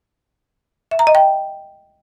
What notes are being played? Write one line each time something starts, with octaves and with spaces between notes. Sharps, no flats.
E5
A#5
D#5
G5